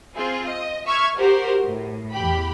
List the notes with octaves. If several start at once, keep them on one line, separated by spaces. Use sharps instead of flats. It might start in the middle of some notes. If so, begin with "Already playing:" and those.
C4 F4 G#4
D#5
E5 C#6 F6 G#6
F#4 G4 A#4 C5
A2
E2 G4 B5